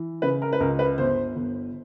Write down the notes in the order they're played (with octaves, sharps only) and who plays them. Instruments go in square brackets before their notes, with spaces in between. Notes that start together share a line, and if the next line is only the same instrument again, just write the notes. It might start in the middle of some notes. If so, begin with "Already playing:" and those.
Already playing: [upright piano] E3
C#3 B4
A#4
B4
C#2 A#4
B4
G1 C5
G1